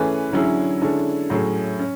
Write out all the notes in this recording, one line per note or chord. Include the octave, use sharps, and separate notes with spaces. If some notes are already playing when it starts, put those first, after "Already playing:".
Already playing: E3 A3 C#4 G#4 B4
D3 F#3 C#4 E4 G#4
D3 G#3 C#4 E4 A4
A2 F#3 A3 C#4 G#4
C#4